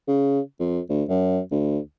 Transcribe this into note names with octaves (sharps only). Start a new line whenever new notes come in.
C#3
F2
D2
F#2
D2